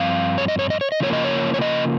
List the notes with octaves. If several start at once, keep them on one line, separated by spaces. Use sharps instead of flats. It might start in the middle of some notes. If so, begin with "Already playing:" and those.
Already playing: G2 F3 C4 F5
C#5
D#5
C#5
D#5
C#5
D#5
C#3 F3 A#3 C#5
D#5
C#5
C#5
D#5